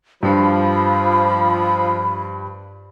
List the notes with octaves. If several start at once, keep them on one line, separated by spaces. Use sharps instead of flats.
G2 F3 B5